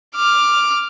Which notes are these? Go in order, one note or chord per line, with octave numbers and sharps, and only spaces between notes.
D6 F6